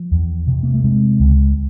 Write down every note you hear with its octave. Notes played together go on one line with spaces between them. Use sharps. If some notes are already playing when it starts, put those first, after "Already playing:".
Already playing: F3
E2
C3
A#3
A3
C3 G#3
C#2